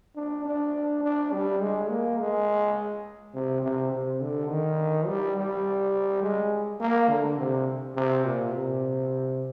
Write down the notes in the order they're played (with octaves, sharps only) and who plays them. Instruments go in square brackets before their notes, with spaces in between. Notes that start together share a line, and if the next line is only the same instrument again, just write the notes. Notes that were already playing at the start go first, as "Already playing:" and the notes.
[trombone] D4
D4
D4
G3
G#3
A#3
G#3
C3
C3
C3
D3
D#3
G3
G3
G#3
A#3
D3
C3
C3
A#2
C3